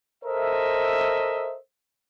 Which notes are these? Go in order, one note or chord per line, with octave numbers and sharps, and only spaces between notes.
A4 A#4 C5 D#5 E5